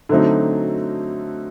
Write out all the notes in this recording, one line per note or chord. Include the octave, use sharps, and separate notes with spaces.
D3 F#3 A3 C4 D#4